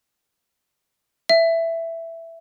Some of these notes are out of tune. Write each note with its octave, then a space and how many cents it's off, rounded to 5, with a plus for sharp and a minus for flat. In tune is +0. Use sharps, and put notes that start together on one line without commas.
E5 +5